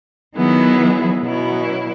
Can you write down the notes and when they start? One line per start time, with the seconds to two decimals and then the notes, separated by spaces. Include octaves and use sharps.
0.36 D#3 F#3 B3 E4 G#4
1.22 B2 F#3 C#4 E4